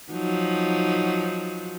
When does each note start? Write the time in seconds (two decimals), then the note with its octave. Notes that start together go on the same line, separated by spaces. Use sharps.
0.12 F3 F#3 D#4